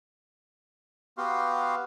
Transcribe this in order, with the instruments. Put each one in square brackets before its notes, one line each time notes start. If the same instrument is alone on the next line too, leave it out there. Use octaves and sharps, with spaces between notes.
[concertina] B3 F#4 G4 F5 C6